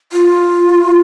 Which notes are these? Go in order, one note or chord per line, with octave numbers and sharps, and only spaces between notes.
F4